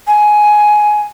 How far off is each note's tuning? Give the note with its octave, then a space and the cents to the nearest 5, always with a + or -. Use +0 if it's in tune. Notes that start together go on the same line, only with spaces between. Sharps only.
G#5 +15